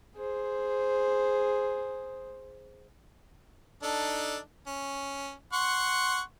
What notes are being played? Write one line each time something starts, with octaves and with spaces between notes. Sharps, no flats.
G#4 C5
D4 D#4 A4
C#4
F#5 C6 C#6